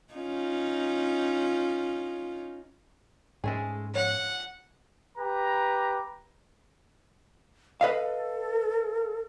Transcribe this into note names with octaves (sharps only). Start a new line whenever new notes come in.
C#4 D#4 F4
G#2 G#3 A3 C#4 G#4
F3 C#5 F#5
G4 B4 A#5
A4 B4 D#5 F5